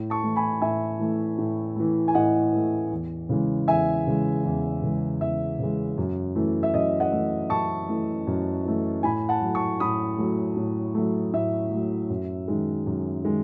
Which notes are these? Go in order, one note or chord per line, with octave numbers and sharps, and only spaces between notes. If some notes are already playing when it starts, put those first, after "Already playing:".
Already playing: A2
A5 C#6
E3 A3
G#5 B5
A2 E5 G#5
E3 A3
A2
E3 A3
G#5
A2 D#5 F#5
E3 A3
E2
C#3 E3 G#3
E2 E5 G#5
C#3 E3 G#3
E2
C#3 E3 G#3
E2 E5
C#3 E3 G#3
F#2
E3 A3
E5
F#2 D#5
D#5 F#5
E3 A3
F#2 A5 C#6
E3 A3
F#2
E3 A3
A2 G#5 B5
F#5 A5
F#3 A3
A5 C#6
A2 B5 D#6
F#3 A3
A2
F#3 A3
A2 E5
F#3 A3
F#2
D#3 G#3
F#2
D#3 G#3